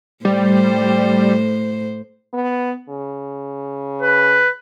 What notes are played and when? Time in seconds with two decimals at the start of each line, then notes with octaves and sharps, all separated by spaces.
0.25 A2 G3 C5
2.34 B3
2.89 C#3
4.02 B4